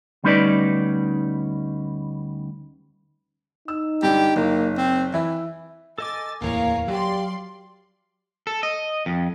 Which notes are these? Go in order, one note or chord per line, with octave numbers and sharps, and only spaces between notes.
D2 G3 C#4 D#4 B4 D5
D#4 E6
G2 D3 G4
F#1 A#3
C4
E3 E4
A4 D#5 G#5 D6 A6
D1 E2 E3 A#3 G#4 A#4 C#5 F5
F#3 G4 D5 C6
A4
D#5
F2